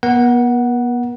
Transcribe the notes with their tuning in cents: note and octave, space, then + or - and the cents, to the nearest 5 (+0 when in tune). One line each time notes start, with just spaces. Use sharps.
B3 -35 A#4 +45 F#5 +0